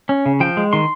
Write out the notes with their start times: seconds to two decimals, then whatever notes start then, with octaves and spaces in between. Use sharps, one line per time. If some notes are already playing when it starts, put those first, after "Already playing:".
0.09 C#4
0.26 C#3
0.40 F3 G5
0.57 G#3
0.73 D#3 C6